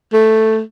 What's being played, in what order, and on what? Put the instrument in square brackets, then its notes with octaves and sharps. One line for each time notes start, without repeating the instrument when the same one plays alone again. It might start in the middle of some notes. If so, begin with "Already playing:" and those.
[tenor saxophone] A3